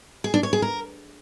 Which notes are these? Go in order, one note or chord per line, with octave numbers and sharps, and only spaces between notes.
G#4
D4
C#5
G#4
A#4